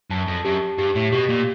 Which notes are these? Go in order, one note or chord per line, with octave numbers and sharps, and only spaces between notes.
F#2 A5
F2
F#2 G4
G2 G4
A2
B2 G4
A#2